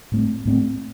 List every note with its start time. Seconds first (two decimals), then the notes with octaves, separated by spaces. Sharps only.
0.12 A2 A3 C4
0.45 A2 A3 C4